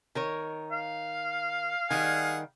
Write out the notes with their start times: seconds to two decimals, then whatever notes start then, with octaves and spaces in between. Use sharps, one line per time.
0.15 D#3 A#4 C#5
0.72 F5
1.91 D#3 G3 G#4 F#5 G#5